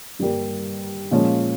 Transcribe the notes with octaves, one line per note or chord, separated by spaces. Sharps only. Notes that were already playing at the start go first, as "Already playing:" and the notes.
G2 G3 A#3
A#2 F3 G#3 C#4